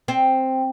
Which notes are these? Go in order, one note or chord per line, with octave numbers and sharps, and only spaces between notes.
C4